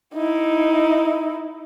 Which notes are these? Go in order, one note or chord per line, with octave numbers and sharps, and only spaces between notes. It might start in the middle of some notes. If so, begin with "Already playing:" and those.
D#4 E4